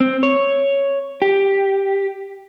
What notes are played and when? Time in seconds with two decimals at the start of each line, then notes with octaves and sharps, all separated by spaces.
0.01 C4
0.23 C#5
1.22 G4